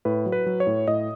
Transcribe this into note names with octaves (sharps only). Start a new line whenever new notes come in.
A2 B4
F#3
B4
F#3
C#5
A2
A2 D#5